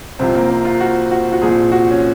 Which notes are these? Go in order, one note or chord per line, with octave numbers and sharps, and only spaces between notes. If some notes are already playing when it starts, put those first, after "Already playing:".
C2 C3 F3 C4
A#3
C4
F4
F#4
F#4
F#4
C2 A#2 F3 G#4
F#4
C#4